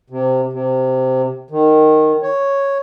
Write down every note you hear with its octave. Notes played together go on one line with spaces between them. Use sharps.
C3
C3
D#3
C#5